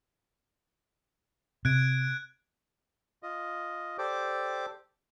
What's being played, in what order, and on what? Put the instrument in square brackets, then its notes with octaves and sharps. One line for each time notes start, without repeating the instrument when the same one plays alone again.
[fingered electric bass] C3 [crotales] F#6 G#6 D7
[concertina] F4 D#5
G4 A4 C5 D5 D6